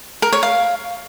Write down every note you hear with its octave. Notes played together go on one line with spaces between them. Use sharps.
A#4
C#5
F5